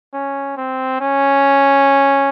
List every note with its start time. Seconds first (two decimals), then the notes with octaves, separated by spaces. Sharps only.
0.14 C#4
0.57 C4
1.01 C#4